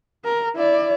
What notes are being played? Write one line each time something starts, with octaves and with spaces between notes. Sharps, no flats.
A#4
E4 D5